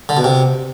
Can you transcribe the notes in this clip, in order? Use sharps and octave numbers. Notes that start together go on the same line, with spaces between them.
D3
B2
C3